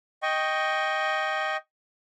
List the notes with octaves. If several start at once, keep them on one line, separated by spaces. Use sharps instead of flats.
D#5 G5 C#6